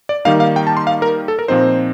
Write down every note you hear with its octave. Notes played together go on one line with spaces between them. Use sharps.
D5
D#3 G3 A#3 D#4 F5
F5
G5
A5
C6
F5
A#4
A4
A#4
A#2 F3 C4 D#4 C5